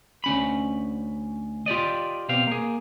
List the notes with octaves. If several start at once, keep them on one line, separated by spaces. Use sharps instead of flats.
D2 C#4 B5
F4 G4 D5 D#5
B2 C4 G4 F5
A#3 G#4